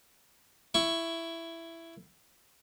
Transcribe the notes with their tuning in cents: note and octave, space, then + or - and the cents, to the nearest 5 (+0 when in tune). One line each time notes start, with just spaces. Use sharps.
E4 +10 C#6 +0